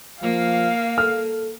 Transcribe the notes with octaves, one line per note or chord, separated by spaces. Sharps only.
F3 A#3 F5
A4 F6